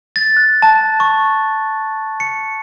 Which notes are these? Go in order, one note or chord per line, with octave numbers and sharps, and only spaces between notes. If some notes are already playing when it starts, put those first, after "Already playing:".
A6
F#6
A5
C#6
C#7